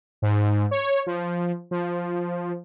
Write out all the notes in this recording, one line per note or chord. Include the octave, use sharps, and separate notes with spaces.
G#2
C#5
F3
F3